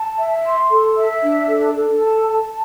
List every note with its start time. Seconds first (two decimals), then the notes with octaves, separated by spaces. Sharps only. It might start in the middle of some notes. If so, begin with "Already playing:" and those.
Already playing: A5
0.19 E5
0.45 C6
0.71 A4
0.97 E5
1.22 D4
1.49 A4
1.75 A4
2.00 A5
2.27 A5